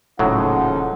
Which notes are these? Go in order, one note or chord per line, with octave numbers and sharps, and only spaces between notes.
D#1 A2 C#3 F3 F#3 D#4 F#5